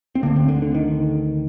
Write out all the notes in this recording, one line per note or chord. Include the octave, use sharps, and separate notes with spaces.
C4
D2 D3 A#3
C4
D3
D3
D#3